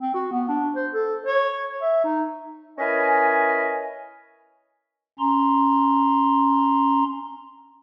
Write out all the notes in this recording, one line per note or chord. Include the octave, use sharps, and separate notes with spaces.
C4
F#4
B3
D4
C5
A4
C#5
E5
D#4
C#4 E4 A#4 B4 D#5 G#5
C#4 A#5 C6